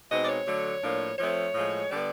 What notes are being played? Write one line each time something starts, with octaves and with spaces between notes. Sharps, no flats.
B2 G#3 C4 D#4 D#5
D5
C#5
D3 F#3 A3
A2 F3 A#3 D4
F3 A3 C4 C#5
A2 F3 G#3
D3 G3 B3 D4 D5